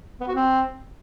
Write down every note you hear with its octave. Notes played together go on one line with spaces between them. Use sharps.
B3
F#4
C4